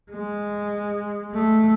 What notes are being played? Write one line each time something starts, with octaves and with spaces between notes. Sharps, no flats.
G#3
A3